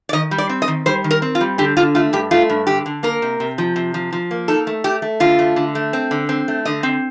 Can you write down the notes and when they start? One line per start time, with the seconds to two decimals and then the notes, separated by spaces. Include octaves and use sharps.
0.09 D5
0.13 D#3 D#5
0.31 G3
0.38 D5
0.49 C4
0.62 D#5
0.68 D#3
0.86 G3 C5
1.04 D#3
1.11 A#4
1.22 C4
1.35 F4
1.41 G3
1.58 D3 G4
1.77 D3 F4
1.95 A3 F4
2.13 G2 G4
2.31 A3 F4
2.50 G2
2.67 D3 G4
2.86 D3
3.03 A#3 A#4
3.22 C3
3.40 C3
3.58 F3
3.76 C3
3.94 F3
4.13 F3
4.31 A#3
4.48 D#4 A4
4.67 A3
4.84 A3 G4
5.02 A3
5.20 D3 F4
5.39 A3
5.56 D3
5.75 A3
5.93 C4
6.11 D3
6.29 C4
6.48 A3
6.65 D3 D#5
6.83 C4